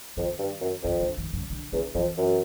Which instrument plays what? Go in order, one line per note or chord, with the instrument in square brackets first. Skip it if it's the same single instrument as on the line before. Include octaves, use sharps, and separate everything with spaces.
[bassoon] F2 [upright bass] D#3
[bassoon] G2
F#2
[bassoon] F2 [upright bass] D#3
[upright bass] D3
D#3
C#3
D3
[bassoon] E2 [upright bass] D3
[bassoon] F2 [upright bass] E3
[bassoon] F#2